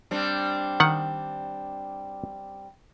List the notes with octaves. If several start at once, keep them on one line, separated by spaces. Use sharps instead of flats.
G3 C4 D4
D#3 F#5